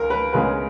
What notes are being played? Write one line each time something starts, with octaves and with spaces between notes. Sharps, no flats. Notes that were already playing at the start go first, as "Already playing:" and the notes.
Already playing: C#2 A#4
B4
C#2 C#3 G#3 B3 B4